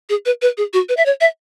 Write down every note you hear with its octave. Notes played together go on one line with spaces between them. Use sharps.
G#4
B4
B4
G#4
F#4
B4
E5
C#5
E5